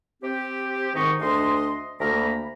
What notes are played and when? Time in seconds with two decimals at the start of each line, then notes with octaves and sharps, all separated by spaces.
0.23 C4 G4
0.96 G#2 D#3 D#4 C#6
1.21 D2 D4 D#5 C6
2.00 D2 A#3 A#5 B5